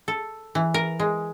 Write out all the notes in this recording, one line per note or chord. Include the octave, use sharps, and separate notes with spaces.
A4
E3
A#4
G#3